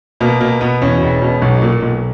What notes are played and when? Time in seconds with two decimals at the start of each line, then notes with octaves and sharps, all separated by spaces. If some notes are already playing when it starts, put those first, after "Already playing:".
0.20 B2 A#3
0.41 B2 A#3
0.61 B2 B3
0.82 E2 C#4
1.02 E1
1.22 B2
1.42 B1
1.62 A#2
1.82 B1